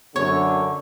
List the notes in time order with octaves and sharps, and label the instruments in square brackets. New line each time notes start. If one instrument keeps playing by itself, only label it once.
[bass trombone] F#2 [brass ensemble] D3 [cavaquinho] C#5